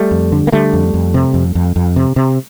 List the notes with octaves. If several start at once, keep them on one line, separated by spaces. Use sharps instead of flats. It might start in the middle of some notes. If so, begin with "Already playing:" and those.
Already playing: G3 A3
F2
D3
A#3
D3 G3 A3
F2
F2
C3
F2
F2
F2
C3
C3